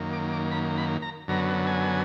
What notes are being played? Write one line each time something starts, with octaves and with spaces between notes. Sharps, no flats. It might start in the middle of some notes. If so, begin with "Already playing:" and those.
Already playing: F#2 D#3 A#3
D6
D6
B5
B5
A#5
F#2 D3 F#3 B3 A#5
G#5